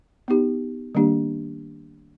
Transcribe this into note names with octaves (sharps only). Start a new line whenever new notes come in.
B3 D#4 G4
D#3 G3 A#3 D4 G4